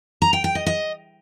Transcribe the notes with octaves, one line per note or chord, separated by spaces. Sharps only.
A#5
G5
G5
D#5
D#5